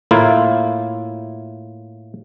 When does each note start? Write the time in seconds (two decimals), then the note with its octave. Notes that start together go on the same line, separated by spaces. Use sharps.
0.11 A2 A#3 E4 F4